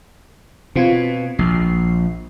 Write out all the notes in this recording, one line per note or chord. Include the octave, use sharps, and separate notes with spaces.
B2 C4 F4 G#6
A#1 C7